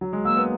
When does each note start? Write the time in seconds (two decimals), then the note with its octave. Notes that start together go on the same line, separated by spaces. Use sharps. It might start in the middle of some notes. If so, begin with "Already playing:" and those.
0.01 F#3
0.13 G#3
0.25 A#3 E6
0.37 B3